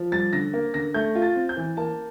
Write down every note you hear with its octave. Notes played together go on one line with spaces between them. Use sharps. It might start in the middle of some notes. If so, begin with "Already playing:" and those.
Already playing: F3
G3 A6
D3 A#6
A#3
D3 A#6
A3 G6
F4
A6
C4
G6
E3
A#3 A5